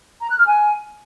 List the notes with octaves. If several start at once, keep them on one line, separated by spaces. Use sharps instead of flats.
A#5
F#6
F6
G#5